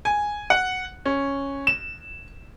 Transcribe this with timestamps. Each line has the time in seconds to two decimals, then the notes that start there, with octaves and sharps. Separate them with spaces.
0.05 G#5
0.50 F#5
1.06 C#4
1.67 E7